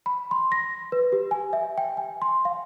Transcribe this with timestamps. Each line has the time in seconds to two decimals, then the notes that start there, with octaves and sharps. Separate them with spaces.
0.06 B5
0.31 C6
0.52 A#6
0.92 B4
1.12 G4
1.31 G#5
1.53 E5
1.78 G5
1.97 G#5
2.22 C6
2.45 F5